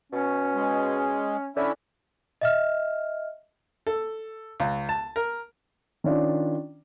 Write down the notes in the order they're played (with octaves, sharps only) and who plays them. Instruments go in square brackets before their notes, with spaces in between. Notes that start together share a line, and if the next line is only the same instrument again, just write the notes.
[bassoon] B2 [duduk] C#4
[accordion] G#3
[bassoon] D3 [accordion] C#4 E4
[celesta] D#5 E5 F6
[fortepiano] A4
C#2
A5
A#4
[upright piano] D#3 C#4 D4 F4 D5